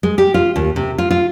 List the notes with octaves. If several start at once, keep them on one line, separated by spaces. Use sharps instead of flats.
G#3
G4
F4
D#2
C3
F4
F4